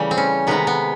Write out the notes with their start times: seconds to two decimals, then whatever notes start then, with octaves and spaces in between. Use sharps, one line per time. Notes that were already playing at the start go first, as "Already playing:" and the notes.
Already playing: C#3 E3 G3 A3
0.11 C4
0.18 C#4
0.47 C3 D#3 G#3 B3
0.67 B3